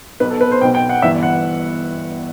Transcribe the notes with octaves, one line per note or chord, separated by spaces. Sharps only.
B1 B2 B4
A4
B4
C5
B1 B2 G5
G5
F#5
G1 G2 E3 E5
F#5